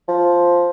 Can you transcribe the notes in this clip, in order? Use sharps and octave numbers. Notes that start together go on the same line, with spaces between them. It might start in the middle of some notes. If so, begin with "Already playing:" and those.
F3